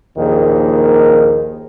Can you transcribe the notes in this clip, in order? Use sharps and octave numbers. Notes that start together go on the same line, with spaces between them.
A#1 D#2 D#3 A#3 G#4